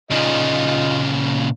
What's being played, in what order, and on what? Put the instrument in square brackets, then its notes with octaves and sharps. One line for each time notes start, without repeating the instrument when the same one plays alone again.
[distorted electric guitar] A#2 C#3 [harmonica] D#4 F4